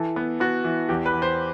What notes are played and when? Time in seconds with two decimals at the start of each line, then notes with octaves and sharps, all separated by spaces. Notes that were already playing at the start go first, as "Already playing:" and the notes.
Already playing: E3 A4
0.16 B3
0.40 B3 F#4
0.64 E3
0.89 E2 G4
1.06 B4
1.14 E2
1.22 C5